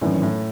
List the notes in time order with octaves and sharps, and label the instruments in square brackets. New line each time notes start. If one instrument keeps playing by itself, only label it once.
[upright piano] G#1 F#2 E3 [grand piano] A2
[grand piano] A2